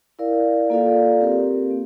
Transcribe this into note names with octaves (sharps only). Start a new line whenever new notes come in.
E4 A#4 D5 F5
A#3 F4 A4 D5 F5
C4 G4 A#4
A#3